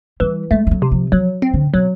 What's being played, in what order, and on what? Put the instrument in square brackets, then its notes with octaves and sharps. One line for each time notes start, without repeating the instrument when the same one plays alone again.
[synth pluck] E3 [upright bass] G3
[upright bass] G#3 [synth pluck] A3
[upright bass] G3
F#3
[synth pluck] C3
[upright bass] F3
[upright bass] F3 [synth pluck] F#3
[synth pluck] C4
[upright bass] D3
[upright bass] B2 [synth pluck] F#3